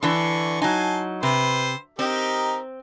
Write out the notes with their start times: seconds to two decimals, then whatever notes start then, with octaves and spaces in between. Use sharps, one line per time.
0.03 D3 E3 D4 C6 C#6
0.62 F#3 D#4 G#5 A5 C6
1.23 C3 B4 C5
1.99 C4 D#4 G4 A#4